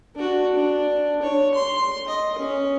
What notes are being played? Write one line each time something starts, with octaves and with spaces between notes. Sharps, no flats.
D4 F#4
D4
C#5
C6
D#5
C#4